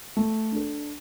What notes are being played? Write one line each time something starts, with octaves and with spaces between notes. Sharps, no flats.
A3
D4 A4